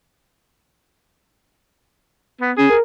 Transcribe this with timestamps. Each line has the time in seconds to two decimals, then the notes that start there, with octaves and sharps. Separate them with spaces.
2.41 B3
2.58 C#4 G#4
2.70 A#4